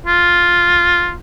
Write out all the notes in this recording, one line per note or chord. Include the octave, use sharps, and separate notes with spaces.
F4